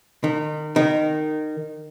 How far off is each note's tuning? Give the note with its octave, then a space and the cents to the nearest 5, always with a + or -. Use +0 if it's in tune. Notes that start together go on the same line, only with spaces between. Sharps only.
D#3 -30
D#3 -15